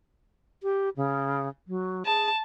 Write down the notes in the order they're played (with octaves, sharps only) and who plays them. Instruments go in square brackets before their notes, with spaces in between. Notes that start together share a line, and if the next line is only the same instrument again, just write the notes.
[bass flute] G4
C#3
F#3
[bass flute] G#4 [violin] A5